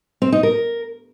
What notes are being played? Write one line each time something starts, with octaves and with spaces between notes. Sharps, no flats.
C4
D#4
A#4